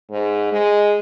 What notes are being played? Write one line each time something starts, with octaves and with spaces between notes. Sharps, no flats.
G#2
G#3